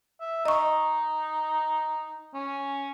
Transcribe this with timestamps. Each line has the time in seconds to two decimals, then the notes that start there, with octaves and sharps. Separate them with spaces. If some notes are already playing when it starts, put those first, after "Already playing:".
0.21 E5
0.45 D#4 D#5 C#6
2.34 C#4